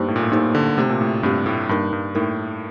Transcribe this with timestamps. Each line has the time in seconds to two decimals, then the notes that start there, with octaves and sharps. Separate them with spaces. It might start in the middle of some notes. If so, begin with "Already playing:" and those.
Already playing: G2 A#3 D#4 G4 C5
0.08 A2
0.16 A#2
0.22 A2
0.32 A#2 A#3 D#4 G4 C5
0.55 D3
0.77 C3 A3 C4 G4
0.89 A#2
1.01 A2
1.23 G2 A3 C4 G4
1.46 A2
1.69 G2 A#3 D#4 A#4
1.93 G2
2.15 A2 A#3 D#4 A#4